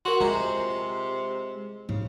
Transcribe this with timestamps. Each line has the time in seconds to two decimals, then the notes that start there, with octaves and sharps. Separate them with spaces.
0.05 F#4 A#4 C6
0.21 C3 G#3 F4 C5 A#5
1.89 G#2 C#3